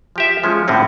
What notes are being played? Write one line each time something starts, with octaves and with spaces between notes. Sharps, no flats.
F3 G4 E5
F3 G#3 C#4
A2 D3 C4 C#4